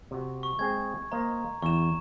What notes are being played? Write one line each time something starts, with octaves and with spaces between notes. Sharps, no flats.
C3 F#4
C#6
G#3 C4 G#4 G#6
A#3 C5 D#5 A#5
E2 C#6 E7